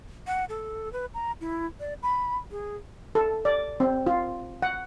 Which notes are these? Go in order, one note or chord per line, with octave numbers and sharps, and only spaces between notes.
F#5
A4
B4
A#5
E4
D5
B5
G#4
A4
D5
C4
F4
F#5